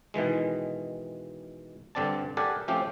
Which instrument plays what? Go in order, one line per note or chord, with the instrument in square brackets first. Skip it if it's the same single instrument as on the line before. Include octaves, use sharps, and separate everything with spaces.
[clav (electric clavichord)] B2 D#3 E3 G#3
G2 D3 C4 D5 A5
G4 A4 A#4 D5 F#5 G#5
F3 A3 C4 C#4 F4 G4